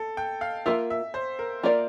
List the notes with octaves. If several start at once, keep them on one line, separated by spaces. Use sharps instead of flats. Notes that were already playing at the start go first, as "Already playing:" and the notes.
Already playing: A4
G5
F5
A#3 F4 A#4 E5
E5
C5
A#4
A#3 F4 A#4 D5